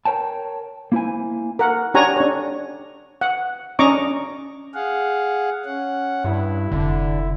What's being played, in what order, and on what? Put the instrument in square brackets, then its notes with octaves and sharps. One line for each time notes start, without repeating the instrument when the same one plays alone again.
[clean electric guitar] A#4 C#5 G5 A5
A#3 E4 C5 G#5
[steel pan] A#4 F#5
D4 G4 C#5 F#5 G#5 A#5
D4 C#5
F#5
C#4 D4 D#5 A#5 C#6 D6
[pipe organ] G#4 F5 F#5
C#4 F#5
[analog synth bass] G2 [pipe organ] E4
[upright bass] F1 A2 [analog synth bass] D3